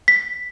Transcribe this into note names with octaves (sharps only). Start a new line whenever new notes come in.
B6